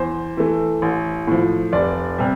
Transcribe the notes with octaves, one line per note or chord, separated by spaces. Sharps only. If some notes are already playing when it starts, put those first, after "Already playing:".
Already playing: E2 C5
E3 A3
A1
A2 F3
F1 D5
C3 G3